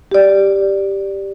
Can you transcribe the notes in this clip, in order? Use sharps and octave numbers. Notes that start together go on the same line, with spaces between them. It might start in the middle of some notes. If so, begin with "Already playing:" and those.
G4 D5